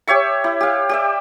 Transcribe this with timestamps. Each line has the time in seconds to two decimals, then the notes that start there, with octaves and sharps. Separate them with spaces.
0.08 G4 C#5 E5 C#6
0.44 E4
0.61 G4 F5
0.89 G4 D5 E5